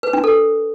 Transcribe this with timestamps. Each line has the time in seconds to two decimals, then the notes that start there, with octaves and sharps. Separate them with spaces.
0.03 B4
0.13 D4
0.24 A4